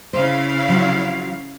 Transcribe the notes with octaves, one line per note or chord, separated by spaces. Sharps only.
C#3 E4 C5 F5
F3 F#3 F#4